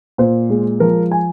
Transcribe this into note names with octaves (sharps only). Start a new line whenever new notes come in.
A#2 C5
G#3
F3 A#4
G#5